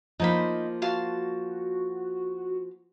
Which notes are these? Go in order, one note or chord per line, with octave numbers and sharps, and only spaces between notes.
F3 A#3 D#4 C5 B5
F#4 F5 A5 C6